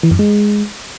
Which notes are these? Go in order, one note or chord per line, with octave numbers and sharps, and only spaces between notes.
E3
F#2
G#3